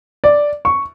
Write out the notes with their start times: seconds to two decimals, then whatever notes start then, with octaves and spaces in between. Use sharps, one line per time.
0.24 D5
0.65 C#6